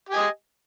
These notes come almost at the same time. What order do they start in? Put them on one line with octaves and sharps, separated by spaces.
G4 G#5 D#5